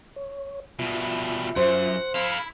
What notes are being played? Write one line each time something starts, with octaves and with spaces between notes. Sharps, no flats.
C#5
B2 G3 F4 E5
F#2 C5 F#5
E4 A4 F5 B5